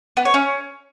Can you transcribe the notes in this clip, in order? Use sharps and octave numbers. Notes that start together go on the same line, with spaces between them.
B3
C#5
C#4